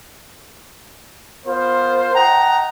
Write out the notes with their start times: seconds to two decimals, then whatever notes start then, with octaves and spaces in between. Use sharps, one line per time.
1.46 B3 F4 A#4 C5
2.15 D#5 F#5 G5 A5 A#5